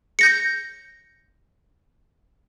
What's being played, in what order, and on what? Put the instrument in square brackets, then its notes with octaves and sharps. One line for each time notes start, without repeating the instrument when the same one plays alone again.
[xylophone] G6 A#6 C#7